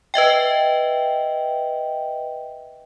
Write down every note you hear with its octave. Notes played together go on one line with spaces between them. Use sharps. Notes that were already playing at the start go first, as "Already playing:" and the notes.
B4 D#5 E5 G5